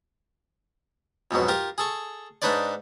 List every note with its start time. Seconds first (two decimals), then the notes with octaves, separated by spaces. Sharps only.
1.31 F2 G#2 B2 F#3
1.48 F4 G4 A#4
1.78 G#4 A4 C#6
2.42 G#2 D4 D#4 B4 C#5 D5